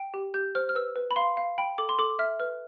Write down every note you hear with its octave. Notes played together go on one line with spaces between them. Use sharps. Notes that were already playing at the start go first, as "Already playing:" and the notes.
Already playing: G5
G4
G4 G6
C5 F6
F6
B4 E6
B4
B5
F5 C6
F5
G5 B5
A4 D6
C6
A4 D6
E5 F6
B4 F6